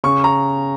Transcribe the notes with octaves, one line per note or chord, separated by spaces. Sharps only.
C#3 C#6
A#5